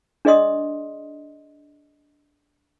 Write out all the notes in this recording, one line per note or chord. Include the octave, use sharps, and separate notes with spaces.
D4 G#4 D5 D#5 C6 D#6